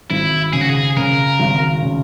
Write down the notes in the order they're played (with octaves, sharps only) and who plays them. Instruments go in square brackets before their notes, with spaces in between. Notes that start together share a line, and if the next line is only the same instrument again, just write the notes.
[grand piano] G#1 [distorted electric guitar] E4
[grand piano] C#3 [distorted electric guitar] G#4
[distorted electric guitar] F#4
G#4
[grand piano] C#3 [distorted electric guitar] A#4
[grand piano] G#1
C#3